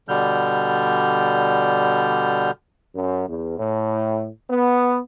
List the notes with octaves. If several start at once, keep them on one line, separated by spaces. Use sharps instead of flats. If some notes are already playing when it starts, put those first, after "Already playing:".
B2 D3 G3 F6 G6
F#2
E2
A2
B3